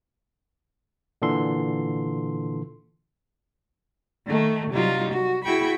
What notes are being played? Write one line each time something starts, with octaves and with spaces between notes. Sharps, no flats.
A#2 D3 E3 A4 C6
D#3 A3
C3 F#3 G3 D#4 F4
F#4
E4 F#4 G#4 G5 B5 C#6